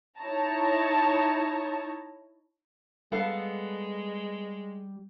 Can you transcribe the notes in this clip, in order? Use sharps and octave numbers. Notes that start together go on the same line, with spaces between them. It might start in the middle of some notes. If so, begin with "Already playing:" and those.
D#4 E4 C#5 A5 A#5
G3 G#3 B3 A4 F5